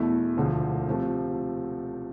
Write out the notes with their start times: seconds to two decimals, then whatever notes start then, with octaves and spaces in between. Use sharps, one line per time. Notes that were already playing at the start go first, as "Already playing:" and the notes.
Already playing: E2 B2 A3 E4
0.37 E1 D2 D3 F3
0.88 C3 F3 A3